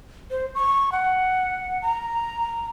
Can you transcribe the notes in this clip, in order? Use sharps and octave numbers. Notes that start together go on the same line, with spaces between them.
C5
C#6
F#5
A#5